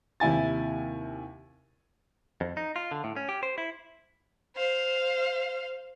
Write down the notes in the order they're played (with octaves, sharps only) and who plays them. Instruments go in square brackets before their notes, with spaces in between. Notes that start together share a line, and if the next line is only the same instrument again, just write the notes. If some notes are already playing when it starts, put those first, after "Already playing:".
[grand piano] D#2 C3 E4 G#5 A6
[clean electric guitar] F2
D#4
F4
D3
A2
C#4
G4
C5
E4
[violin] C5 F5